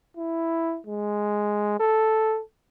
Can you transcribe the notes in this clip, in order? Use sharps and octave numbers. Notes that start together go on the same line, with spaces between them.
E4
G#3
A4